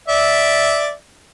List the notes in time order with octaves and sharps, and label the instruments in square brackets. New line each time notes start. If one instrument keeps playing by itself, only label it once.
[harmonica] D5 E5